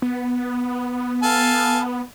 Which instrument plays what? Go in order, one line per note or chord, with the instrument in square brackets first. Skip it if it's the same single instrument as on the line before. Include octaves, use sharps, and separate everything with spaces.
[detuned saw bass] B3
[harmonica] A4 F5 G#5